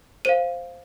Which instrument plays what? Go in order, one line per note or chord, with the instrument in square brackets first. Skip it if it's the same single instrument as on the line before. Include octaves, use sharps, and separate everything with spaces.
[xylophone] C5 F5 D#7